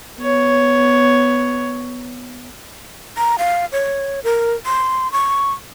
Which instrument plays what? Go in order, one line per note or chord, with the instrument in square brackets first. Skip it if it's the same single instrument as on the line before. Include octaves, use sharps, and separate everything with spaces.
[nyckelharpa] B3 C#5
[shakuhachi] A#5
F5
C#5
A#4
C6
C#6